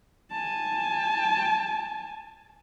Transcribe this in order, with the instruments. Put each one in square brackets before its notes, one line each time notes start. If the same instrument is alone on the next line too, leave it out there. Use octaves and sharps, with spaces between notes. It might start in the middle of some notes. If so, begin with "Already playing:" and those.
[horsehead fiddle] G#5 A5